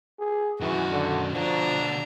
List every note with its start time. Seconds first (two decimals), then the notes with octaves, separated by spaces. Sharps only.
0.19 G#4
0.61 F#2 D#3 E3 F#4
0.92 D3
1.33 B2 D3 F3 D4 A#5